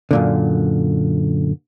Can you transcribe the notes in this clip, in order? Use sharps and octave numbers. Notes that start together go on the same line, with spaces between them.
F#2 A#2 D3